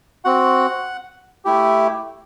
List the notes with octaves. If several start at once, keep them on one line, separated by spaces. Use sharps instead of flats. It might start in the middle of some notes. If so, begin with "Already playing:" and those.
C4 F#4 F#5
A3 E4 G4